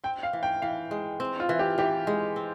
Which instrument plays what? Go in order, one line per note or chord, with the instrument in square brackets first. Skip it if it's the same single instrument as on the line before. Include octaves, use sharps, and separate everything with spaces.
[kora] C4 [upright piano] G5
[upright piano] F5
[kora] E3
[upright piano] G5
[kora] E3 [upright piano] F5
[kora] G#3
C4
[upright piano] F4
[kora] E3
[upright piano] G4
[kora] E3 [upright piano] G4
[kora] G#3
C4